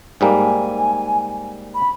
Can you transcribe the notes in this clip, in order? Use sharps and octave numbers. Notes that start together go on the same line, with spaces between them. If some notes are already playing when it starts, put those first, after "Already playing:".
G#2 G3 A#3 G#5
B5